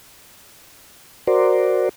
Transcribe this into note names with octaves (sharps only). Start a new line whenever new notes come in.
F#4 A#4 C5 D5